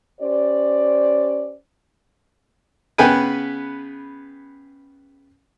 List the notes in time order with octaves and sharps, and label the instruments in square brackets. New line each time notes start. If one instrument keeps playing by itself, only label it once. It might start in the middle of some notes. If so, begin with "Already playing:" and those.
[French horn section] C#4 G4 C5 D5
[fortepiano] C#3 B3 B4 G5 G#5